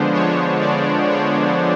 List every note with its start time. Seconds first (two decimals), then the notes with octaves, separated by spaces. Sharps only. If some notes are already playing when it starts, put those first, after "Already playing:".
Already playing: D3 F3 G#3 B3 D4 C5
0.14 C#5
0.61 D5
1.10 C#5